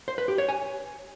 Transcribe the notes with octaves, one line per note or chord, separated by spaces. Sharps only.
C5
B4
G4
C#5
G#5